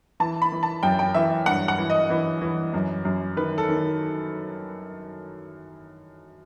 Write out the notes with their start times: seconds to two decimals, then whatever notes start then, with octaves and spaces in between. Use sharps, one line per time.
0.20 E3 A5
0.42 B5
0.52 E3
0.63 A5
0.83 F#2 G5
0.99 G5
1.14 E3 E5
1.46 G2 F#5
1.68 F#5
1.78 E3
1.90 D#5
2.10 E3
2.41 E3
2.74 F#2
3.05 F#2
3.37 D#3 B4
3.58 A4
3.69 D#3